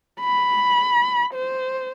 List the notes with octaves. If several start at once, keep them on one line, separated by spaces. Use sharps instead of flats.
B5
C5